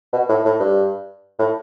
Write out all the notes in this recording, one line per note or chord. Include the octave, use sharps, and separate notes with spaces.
B2
A2
A2
G2
A2